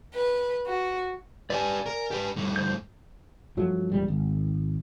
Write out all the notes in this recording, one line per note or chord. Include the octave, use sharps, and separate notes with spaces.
B4
F#4
G4 B4 D5 G#5
A#4
G4 B4
G2 A3
C5 G6
G2 F3 F#3 A3
E1 A#1 G3
G#1